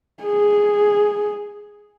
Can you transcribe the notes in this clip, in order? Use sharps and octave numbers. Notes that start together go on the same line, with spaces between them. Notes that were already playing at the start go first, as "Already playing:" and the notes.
G#4